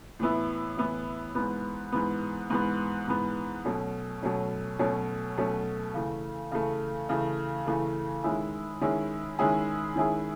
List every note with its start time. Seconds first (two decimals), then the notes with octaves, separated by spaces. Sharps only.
0.19 A2 E3 B3 E4
0.77 A2 E3 B3 E4
1.35 G#2 E3 B3
1.92 G#2 E3 B3
2.50 G#2 E3 B3
3.07 G#2 E3 B3
3.65 B2 F#3 A3 C#4
4.22 B2 F#3 A3 C#4
4.79 B2 F#3 A3 C#4
5.37 B2 F#3 A3 C#4
5.94 C#3 E3 A3
6.51 C#3 E3 A3
7.09 C#3 E3 A3
7.66 C#3 E3 A3
8.24 D#3 G#3 C#4 E4 G#4
8.81 D#3 G#3 C#4 E4 G#4
9.39 D#3 G#3 C#4 E4 G#4
9.96 D#3 G#3 C#4 E4 G#4